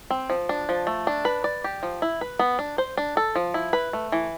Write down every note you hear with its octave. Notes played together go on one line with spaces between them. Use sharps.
C4
F3
D4
F3
A3
D4
B4
D5
G4
F3
E4
B4
B3
D4
C5
D4
A4
F3
E4
B4
A3
E3